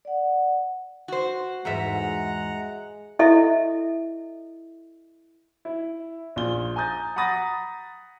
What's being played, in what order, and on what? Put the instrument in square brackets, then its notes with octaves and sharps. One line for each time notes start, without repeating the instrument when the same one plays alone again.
[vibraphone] D5 F#5
[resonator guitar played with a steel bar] F#4 C5
[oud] E2 G#2 E5 [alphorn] G#3 [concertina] F#5 A#5
[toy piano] E4 A4 D#5 E5
[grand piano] E4
A#1 F4 G7
G#5 A#5 D#6 G6 A6
F#5 A#5 B5 D#6 A6 A#6